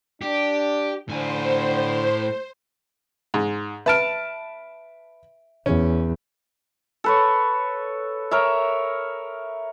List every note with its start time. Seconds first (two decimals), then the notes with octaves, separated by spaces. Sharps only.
0.22 D4 G4
1.09 A2 D3 C5 G#5
3.34 G#2
3.86 B4 E5 A5 F6 D7
5.66 E2 C#4
7.04 A4 B4 C#5
8.31 A#4 C#5 E5